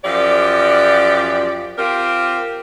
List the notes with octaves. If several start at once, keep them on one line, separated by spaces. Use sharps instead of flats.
F#2 F3 G4 D5
C4 F4 G4 A#4